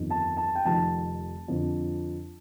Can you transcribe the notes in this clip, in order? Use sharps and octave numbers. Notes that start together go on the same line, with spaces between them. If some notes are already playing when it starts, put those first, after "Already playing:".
Already playing: G1 F2 D#3
A5
A5
G5
F1 F2 D#3 A5
F2 D3 F3